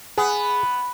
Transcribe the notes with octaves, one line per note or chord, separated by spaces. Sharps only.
B3 G#4